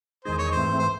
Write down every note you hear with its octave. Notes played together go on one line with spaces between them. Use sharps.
E2 D#3 G#3 D#4 G#4 C5
C#5
C5
G#2 E3 A3 C4
C5